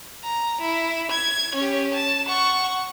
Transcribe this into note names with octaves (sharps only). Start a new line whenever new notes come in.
A#5
E4
G#6
C#4 G4
A5
F#5 C#6